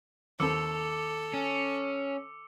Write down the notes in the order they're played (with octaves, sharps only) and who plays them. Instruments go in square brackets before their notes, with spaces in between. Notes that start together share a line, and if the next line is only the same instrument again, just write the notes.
[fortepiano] D#2 C4 B5 [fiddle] A4 [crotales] D6 E6 C#7
[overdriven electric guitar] C#4